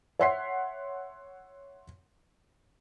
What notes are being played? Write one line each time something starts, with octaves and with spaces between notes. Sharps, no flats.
C#5 E5 F#5 C6 B6 C7